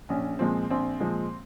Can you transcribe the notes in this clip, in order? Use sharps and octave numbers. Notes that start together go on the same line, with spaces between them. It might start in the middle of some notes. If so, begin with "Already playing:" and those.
A#1 C#4
A#2 F3 G#3 C4
A#1 C4
A#2 F3 G#3